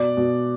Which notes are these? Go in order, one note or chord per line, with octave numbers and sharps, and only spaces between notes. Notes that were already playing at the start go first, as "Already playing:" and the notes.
Already playing: B2 D5
B2